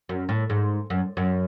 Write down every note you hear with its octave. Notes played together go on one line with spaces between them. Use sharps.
F#2
A2
G#2
F#2
F#2